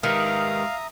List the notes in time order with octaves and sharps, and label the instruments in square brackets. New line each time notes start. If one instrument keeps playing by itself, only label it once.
[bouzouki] D#3 [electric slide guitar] G#3 G4 B4 [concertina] E5 A#5 D#6 [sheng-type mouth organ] F5